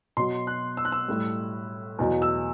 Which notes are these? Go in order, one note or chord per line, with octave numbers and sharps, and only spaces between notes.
B2 F#3 C6
F#6
E6
F#6
E6
A2 G3
E2 B2 F#3
E6